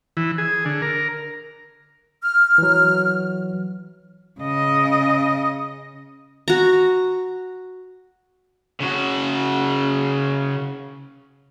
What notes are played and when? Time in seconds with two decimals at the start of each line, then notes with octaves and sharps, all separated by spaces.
0.17 E3
0.38 G#4
0.65 D3
0.82 A#4
2.22 F6
2.58 E3 F#3
4.40 C#3 D#5
6.48 F#4 A#5
8.80 C#3 F#4